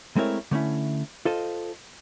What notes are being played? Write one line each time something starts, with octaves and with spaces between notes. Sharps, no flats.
G#3 A3 C4 E4 A#4 C#5
D3 A3 C#4 E4
F4 A4 C5 D#5